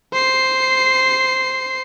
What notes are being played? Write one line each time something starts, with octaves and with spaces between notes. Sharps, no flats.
C5 C7